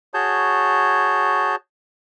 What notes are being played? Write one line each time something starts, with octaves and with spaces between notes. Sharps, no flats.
F#4 G#4 C#5 A5 G6